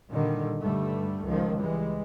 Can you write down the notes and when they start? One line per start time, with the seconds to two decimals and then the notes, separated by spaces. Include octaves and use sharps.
0.11 A#2 D3 D#3 G3
0.62 G2 D3 G3 A3
1.24 C#2 D#3 F3
1.59 E3 G3 G#3